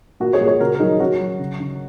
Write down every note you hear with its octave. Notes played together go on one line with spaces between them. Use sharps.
A#2 F#4 A#4
G#4 C#5
A#2
G#4 C#5
C#3 F#4 A#4
A#4
F#3 D#4 G#4
F#3 C#4 F#4
F#3
C#3
C#3